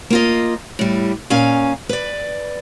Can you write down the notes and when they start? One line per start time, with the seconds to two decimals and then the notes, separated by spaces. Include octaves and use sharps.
0.10 A#3 F4 D#5
0.79 A2 G3
1.30 A#2 C#4 F5 G#5
1.89 B4 D5